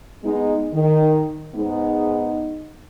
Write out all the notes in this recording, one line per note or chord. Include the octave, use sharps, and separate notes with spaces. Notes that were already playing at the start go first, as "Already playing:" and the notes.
G#3 B3 D#4
D#3
G#2 G#3 B3 D#4